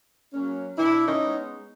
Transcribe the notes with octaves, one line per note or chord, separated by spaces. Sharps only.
F#3 A#3 C#4
B2 D4 E4
C#4 D#4
G#3 B3